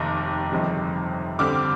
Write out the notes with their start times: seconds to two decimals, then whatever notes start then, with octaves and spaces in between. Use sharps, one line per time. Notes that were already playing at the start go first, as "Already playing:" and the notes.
Already playing: F1 D#2 D#3 A#5 D6
0.51 G1 F2 C3 D#3 G#3
1.39 G2 D3 G3 C4 D6 F6